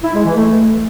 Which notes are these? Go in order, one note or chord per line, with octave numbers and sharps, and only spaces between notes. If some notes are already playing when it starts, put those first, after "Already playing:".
E4
G#3
E3
A3